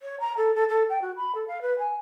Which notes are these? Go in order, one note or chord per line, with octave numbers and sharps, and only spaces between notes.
C#5
A#5
A4
A4
A4
G5
F#4
B5
A4
F5
B4
G#5